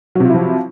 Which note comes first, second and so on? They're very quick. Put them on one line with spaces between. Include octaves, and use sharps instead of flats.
F#3 C3 F4 E4 F3